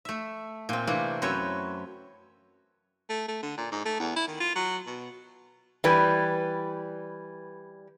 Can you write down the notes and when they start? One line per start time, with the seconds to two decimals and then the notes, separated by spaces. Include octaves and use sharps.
0.05 A3 E5
0.69 A#2 C4
0.87 C3 E3 A3 A#3 D4
1.22 F#2 C4 B4 C#5 E5
3.09 A3
3.28 A3
3.43 D3
3.58 A#2
3.71 G#2
3.85 A3
4.00 E2
4.16 E4
4.28 D#3
4.40 F4
4.55 F#3
4.86 B2
5.84 E3 G3 B4